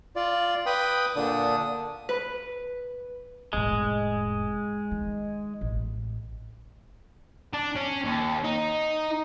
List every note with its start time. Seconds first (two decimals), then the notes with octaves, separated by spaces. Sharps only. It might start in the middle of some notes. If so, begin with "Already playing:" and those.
0.16 F4 D5
0.66 B4 G5 B5 D#6
1.16 A#2 D3 D4 D#6
2.09 B4
3.53 F1 A2 G#3
4.91 D#3
5.61 A1
7.53 D4
7.76 C#4
8.04 D#2
8.44 D#4